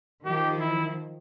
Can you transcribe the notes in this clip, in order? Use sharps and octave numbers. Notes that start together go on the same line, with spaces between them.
D#3 F3 G4
E4